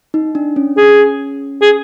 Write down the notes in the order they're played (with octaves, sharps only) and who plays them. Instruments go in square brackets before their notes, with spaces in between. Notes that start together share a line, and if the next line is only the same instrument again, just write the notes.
[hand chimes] D#4
D4
C#4
[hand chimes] C#4 [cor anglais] G#4
[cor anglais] G#4